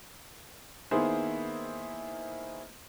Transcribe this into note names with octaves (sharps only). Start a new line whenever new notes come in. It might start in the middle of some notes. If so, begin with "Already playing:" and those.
D#3 A#3 B3 E4 G#4 C5